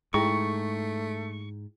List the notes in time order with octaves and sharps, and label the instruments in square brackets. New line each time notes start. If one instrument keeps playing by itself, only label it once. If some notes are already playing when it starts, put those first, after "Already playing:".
[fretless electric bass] G#2 [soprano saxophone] A3 [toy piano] E4 G#4 G5 [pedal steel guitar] C#6